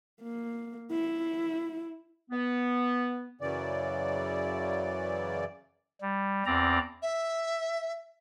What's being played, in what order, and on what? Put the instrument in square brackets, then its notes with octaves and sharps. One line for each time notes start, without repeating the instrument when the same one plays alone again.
[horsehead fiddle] A#3
E4
[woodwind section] B3
[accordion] F#2 C#3 E3 D5
[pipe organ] G3
E2 C4 D5 A#5
[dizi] E5